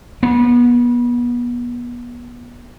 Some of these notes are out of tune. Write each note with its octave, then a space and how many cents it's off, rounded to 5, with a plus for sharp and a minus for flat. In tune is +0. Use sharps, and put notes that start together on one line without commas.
B3 -30